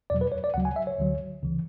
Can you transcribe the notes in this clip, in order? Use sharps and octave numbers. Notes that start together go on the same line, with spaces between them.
E2 B2 F#3 D5
B4
C#5
D5
D2 C#3 F#3 F#5
G#5
E5
C#5
D2 D3 F#3
C#2 C#3 E3